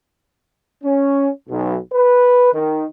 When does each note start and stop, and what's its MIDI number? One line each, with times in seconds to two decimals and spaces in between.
0.84 1.29 61
1.49 1.77 35
1.93 2.52 71
2.53 2.84 51